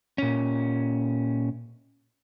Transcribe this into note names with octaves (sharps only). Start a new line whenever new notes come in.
A#2 C#4